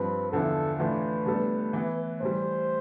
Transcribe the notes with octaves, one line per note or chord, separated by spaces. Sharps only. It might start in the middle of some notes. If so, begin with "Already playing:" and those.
Already playing: G2 F3 C4 B4
E2 D3 F3 B3 E4 A4
A2 E3 A3 D4 F4 B4
A2 G3 B3 D4 A4
E3 B3 E4
A2 E3 G3 C5